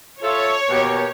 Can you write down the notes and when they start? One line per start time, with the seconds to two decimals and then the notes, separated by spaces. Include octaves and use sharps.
0.23 F4 A4 C#5 E5
0.69 B2 A#3 G4